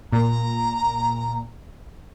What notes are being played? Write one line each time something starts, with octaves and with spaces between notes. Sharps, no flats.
A#2 A#5